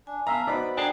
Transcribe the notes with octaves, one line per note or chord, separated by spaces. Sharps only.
D4 G#5
B3 E5 F5 A5 A#5 E6
B3 D#4 F#4 C5 D5 B5
D4 G#4 F#5 G5 A#5 C7